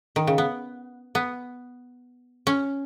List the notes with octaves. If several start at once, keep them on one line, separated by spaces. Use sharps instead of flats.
D#3
C#3
B3
B3
C#4